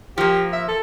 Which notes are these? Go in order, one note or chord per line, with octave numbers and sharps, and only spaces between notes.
F3 A#3 G4
E5
A4